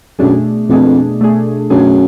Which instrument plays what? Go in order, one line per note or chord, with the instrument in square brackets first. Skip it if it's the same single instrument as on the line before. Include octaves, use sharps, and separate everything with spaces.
[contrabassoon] F#2 [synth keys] B2 A3 D4 G#4
[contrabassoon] F2 [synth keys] B2 A3 D4 G#4
[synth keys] B2 A3 D4 G#4
[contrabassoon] F#2 [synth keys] B2 A3 D4 G#4